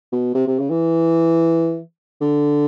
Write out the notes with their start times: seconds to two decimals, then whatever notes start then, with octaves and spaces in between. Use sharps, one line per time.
0.12 B2
0.35 C3
0.47 C3
0.59 C#3
0.70 E3
2.21 D3